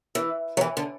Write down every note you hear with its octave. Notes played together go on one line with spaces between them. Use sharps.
E3
F#3
E3
D3